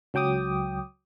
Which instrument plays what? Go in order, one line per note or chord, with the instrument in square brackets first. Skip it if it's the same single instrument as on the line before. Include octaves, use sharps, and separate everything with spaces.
[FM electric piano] C#2 F#3 G5 D6 D#6